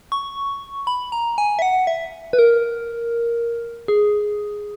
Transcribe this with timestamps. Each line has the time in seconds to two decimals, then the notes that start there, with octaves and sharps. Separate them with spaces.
0.12 C#6
0.87 B5
1.12 A#5
1.38 G#5
1.59 E5
1.62 F#5
1.87 E5
2.33 B4
2.39 A#4
3.88 G#4